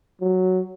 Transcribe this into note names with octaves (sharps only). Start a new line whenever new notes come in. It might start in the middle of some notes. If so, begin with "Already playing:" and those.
F#3